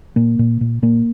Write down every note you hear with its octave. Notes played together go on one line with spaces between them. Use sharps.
A#2 A#3
A#2
A#2
A#2 A#3